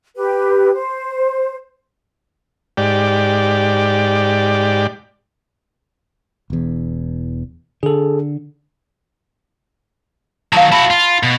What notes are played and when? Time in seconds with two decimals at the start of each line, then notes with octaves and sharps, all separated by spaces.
0.15 G4 B4
0.75 C5
2.77 G#2 G4 D5
6.50 E1 E2
7.83 D3 G#4 A4
10.53 D#3 F#3 F5 A5
10.72 E4 F#4 A5 B5
10.90 F4
11.23 B2